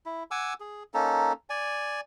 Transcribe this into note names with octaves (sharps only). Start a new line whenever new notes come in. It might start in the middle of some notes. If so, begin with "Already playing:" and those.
E4
F#5 G#5 D6 E6
G#4
A#3 C#4 D#4 A4
D5 G#5